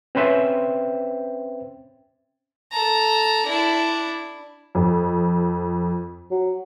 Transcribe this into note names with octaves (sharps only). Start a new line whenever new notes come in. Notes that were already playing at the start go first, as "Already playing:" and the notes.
C4 C#4 B4 C5 E5 G5
A4 A#5
D4 E4
F2
F#3